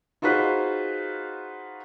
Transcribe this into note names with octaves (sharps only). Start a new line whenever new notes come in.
D#4 F4 F#4 G#4 B4 C5